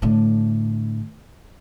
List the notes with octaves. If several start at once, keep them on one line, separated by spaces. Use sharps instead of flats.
A2 D3